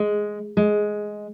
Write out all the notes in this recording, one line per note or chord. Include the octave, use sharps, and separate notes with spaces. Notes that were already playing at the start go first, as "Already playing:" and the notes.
Already playing: G#3
G#3